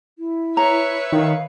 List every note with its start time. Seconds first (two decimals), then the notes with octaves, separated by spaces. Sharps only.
0.19 E4
0.57 B4 C#5 E5 A#5
1.12 D#3 F5